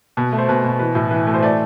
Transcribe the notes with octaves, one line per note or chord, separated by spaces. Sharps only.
B2 B4
A3
C5
B2 B4
B2
E3 B4
A2
E3 B4
A3
C5
A3 D5